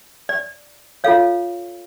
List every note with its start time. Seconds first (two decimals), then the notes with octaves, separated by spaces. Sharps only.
0.29 D5
1.04 F4 A4 C#5 F5